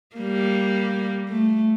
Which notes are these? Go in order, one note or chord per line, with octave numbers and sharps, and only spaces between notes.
G3 A#3
A3